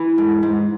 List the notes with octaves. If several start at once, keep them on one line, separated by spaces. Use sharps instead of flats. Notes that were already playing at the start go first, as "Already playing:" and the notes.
Already playing: E3
G#2
G#2